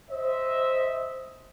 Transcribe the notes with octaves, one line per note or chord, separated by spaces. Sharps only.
C5 D#5 E5